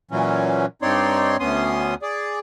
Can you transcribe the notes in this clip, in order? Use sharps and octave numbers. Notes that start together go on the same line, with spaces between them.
A#2 E3 F#3 C#4
G2 C4 D#4 C#5 D5 C6
D2 B3 C#4 C6 D#6
G#4 D5